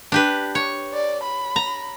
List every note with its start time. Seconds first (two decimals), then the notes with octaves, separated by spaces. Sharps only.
0.12 D4 G4 B4
0.55 C#5
0.93 D5
1.23 B5
1.56 A#5